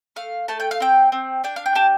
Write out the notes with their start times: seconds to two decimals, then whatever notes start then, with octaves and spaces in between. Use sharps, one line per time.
0.16 A3 F5
0.48 A3 A5
0.60 G5
0.71 F5
0.80 C4 G5
1.12 C4
1.44 D4 G5
1.56 F5
1.66 G5
1.75 G4 A5